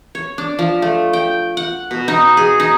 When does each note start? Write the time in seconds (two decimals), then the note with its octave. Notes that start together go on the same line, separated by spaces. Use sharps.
0.15 C#5
0.38 D4
0.59 F3
0.82 A3
1.13 G5
1.57 F#5
1.91 B2
2.08 D#4
2.37 G#4
2.60 D#4